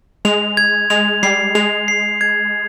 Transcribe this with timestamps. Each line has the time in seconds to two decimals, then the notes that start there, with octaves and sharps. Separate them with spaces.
0.25 G#3 F7
0.57 G#6
0.90 G#3 F7
1.23 G3 C7
1.55 G#3 F7
1.88 C7
2.21 G#6